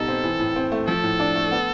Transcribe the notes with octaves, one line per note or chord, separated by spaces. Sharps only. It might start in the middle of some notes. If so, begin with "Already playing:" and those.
Already playing: B2 G3 D#4 A4
C4
E3
A2
C4
A3
F3 A4
A2
D4
A3
B3